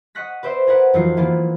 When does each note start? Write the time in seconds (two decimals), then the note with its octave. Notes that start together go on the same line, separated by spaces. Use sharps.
0.15 D#5 F#5 C#6 F#6 A#6 B6
0.43 B4 C5 D5 E5 C6
0.67 G#4 A#4 B4 F#5
0.94 F2 E3 F#3 D#4 F4 C7
1.17 E3 A#3 B3 F4 G#4